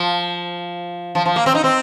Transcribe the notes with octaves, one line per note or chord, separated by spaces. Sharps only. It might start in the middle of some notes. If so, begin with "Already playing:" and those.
Already playing: F3
F3
F3
A#3
C4
D#4
C4